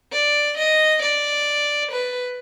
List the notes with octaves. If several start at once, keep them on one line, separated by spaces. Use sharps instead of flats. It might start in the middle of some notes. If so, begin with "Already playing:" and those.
D5
D#5
D5
B4